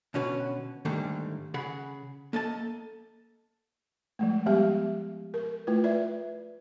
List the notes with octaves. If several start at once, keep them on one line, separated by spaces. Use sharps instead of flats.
B2 D3 C#4 F#4 B4
G#2 D3 D#3 G3 A3 A#3
C#3 G#4 F#5 B5
A#3 A4 D#5 A5
F3 G#3 A3
F3 G3 G#3 B3 G4 E5
A#4
A3 E4 F4 B4
B4 D5 E5